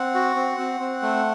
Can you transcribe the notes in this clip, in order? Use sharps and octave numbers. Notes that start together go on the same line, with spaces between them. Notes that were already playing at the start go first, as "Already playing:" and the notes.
Already playing: C4 F#5
F#4
C4
C4
C4
A3